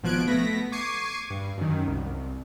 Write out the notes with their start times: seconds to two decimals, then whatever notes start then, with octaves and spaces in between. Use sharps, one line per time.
0.03 G#1 B2 F3 F#6 G#6 D7
0.27 A3 B3 A#6 B6
0.72 C#6 D6 G#6 C7 D#7
1.30 G2
1.58 F#2 D#3
1.87 C2